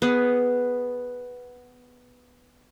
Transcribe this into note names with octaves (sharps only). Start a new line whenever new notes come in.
B3 G#4